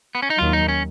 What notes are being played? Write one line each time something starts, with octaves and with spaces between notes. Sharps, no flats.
B3
C#4
D#4
D#2 D#3 F#3 F4
D#4
C#4